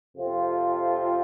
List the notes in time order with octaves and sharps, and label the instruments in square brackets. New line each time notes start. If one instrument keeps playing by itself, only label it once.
[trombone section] F2 C3 F3 C4 F4